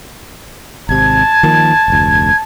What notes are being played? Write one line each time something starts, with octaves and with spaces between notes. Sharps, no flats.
G#1 C3 A5 G#6
D#3 F3 A#3
F1 D2